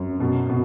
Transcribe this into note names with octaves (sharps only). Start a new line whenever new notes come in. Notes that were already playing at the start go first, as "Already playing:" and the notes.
Already playing: F#2
B2
B2